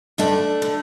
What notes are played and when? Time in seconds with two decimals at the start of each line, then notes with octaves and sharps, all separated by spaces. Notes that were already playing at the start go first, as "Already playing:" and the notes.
0.18 G2 D3 A3 D4
0.62 D3